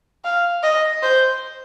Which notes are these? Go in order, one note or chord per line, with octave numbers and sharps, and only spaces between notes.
F5
D#5
C5